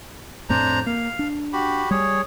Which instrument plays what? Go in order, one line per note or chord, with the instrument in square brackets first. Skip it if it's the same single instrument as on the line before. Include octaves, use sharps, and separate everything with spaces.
[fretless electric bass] F2 A2 C4 [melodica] D4 C5 A#5
[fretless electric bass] A#3 [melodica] F5
[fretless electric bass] D4
[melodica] F#4 G4 B5
[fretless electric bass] G3 [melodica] G#4 C#5